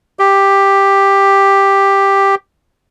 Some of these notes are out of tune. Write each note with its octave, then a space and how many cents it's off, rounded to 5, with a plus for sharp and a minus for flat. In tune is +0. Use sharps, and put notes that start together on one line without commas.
G4 +5